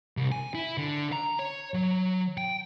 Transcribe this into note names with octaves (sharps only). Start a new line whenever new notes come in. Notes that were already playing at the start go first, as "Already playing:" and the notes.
C2
G#5
E4
D3
A#5
C#5
F#3
G5